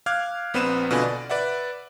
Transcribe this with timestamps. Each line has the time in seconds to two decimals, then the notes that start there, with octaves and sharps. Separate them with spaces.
0.06 F5 D6 F6 F#6 G#6
0.54 A#1 B3 C4 B4 D#7 E7
0.91 B2 D3 F4 B4 D#5 G#5
1.03 D5
1.30 B4 D5 E5 F#5